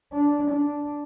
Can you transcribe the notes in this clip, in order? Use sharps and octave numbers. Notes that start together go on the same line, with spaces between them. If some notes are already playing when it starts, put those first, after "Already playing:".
D4
D4